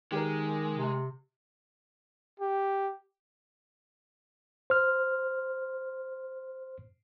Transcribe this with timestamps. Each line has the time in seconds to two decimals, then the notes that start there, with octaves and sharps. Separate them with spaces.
0.12 D#3 G#3 G4 A#4
0.72 C3
2.40 G4
4.70 C5 F6